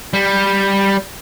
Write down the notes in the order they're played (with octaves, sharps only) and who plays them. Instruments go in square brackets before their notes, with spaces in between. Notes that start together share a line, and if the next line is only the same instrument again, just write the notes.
[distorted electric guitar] G3